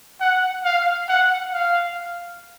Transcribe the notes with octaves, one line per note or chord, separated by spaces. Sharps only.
F#5
F5
F#5
F5